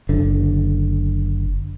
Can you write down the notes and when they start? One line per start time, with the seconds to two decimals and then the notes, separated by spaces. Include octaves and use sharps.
0.09 F#1 D3